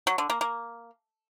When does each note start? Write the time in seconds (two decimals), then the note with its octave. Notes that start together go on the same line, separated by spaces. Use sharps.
0.07 F#3
0.18 D3
0.30 A#3
0.41 A#3